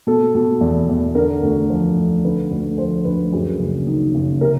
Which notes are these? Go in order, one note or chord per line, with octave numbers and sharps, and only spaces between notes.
B2 A4
B2
E2
E2
D3 A#4
D2
F3
D2
D3 B4
D2
F3 C5
D2 B4
F#2 G#4
F#1
D#3
F#1
C3 A#4